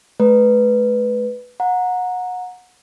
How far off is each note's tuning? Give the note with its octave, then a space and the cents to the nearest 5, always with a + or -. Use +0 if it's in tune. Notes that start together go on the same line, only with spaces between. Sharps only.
A3 -35 B4 +0
F#5 -25 A#5 +0